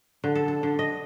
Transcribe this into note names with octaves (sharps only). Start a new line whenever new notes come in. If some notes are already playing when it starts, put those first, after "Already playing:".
D3
A4
A4
D3
D#5